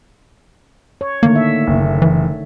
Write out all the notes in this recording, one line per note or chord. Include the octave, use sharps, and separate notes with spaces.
C#5
D3 D#3 A3 A#3
E5
F#1
E3